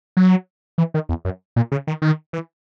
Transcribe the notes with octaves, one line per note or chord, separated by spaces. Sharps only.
F#3
E3
D#3
E2
F#2
A#2
C#3
D#3
D#3
E3